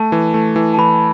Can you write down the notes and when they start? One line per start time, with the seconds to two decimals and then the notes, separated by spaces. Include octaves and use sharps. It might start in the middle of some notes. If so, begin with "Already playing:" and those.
Already playing: A3 A5
0.12 E3
0.34 A3
0.56 E3
0.74 A5
0.78 E3 B5